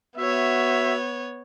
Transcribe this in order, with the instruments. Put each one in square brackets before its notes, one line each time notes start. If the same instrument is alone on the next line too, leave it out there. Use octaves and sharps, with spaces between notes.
[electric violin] B3 C#5 [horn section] F#4 E5